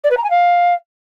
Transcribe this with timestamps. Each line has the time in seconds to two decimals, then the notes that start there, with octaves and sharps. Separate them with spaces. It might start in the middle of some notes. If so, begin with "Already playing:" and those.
0.04 D5
0.11 B4
0.17 A#5
0.24 G#5
0.30 F5